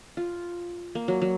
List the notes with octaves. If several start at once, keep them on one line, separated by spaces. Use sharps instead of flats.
F4
A#3
F#3
F#3